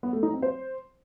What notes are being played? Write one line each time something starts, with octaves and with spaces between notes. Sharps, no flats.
B3
A3
D#4
C4
C5